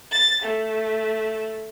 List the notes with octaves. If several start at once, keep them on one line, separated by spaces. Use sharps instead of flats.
A6
A3